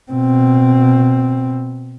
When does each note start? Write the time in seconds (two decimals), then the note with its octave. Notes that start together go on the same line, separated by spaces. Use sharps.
0.12 B2 C4